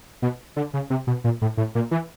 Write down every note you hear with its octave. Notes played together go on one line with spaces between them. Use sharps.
B2
D3
C#3
C3
B2
A#2
A2
A2
A#2
E3